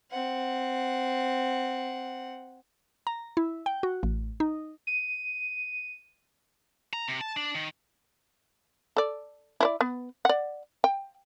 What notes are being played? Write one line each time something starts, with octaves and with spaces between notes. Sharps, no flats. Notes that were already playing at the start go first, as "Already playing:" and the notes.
C4 F#5
A#5
E4
G5
F#4
A1
D#4
D#7
A#5
C3
A5
D4
D#3
A4 D5
E4 C5 D5
B3
D5 F#5
G5